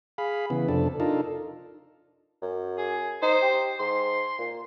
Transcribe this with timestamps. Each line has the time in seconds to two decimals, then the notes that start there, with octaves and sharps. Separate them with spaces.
0.18 G#4 F5 B5
0.50 C#3 E3 B3
0.69 F2 C3 D4 A4
1.00 D4 D#4 F4 A4 A#4
2.42 F#2
2.78 G#4
3.22 D#4 C5
3.42 G4
3.80 G#2 C6
4.39 A#2